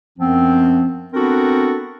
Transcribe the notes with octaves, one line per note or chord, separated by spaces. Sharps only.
F#2 F3 B3 C4
B3 C4 D4 F#4 A4 A#4